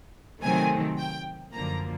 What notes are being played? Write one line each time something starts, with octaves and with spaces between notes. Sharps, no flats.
C3 D#3 F#3 A3 C4 G#5
G5
F#2 D3 F3 A#3 A#5